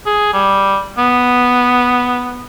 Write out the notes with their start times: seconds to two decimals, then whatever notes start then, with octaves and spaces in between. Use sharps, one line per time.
0.06 G#4
0.33 G3
0.98 B3